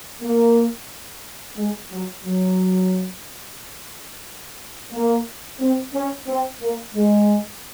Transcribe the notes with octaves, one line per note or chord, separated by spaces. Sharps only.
A#3
G#3
F#3
F#3
A#3
C4
C#4
C4
A#3
G#3